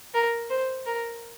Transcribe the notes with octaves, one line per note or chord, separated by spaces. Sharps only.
A#4
C5
A#4